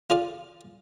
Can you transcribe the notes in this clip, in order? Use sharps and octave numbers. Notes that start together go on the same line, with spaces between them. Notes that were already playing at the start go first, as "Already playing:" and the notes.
F4 G#4 D5 F5